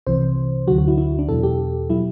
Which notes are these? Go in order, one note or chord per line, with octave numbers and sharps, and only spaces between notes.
C2 C3 E3 C5
D2 D3 F#3 F#4
F#4
E4
E4
D4
E2 B2 F#3 A4
G4
B2 F#3 E4